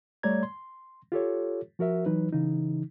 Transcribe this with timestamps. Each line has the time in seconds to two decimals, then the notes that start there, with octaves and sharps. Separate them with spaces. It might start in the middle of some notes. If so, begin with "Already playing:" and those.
0.23 G3 A3 C#5 D5 A#5 G#6
0.43 C6
1.12 F4 G4 A4 C#5
1.79 F3 F#4 A#4 E5
2.06 E3 F#3 D#4 B4
2.33 C#3 E3 D#4